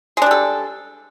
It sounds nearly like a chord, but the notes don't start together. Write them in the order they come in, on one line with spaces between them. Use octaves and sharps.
G#3 D4 G3 A4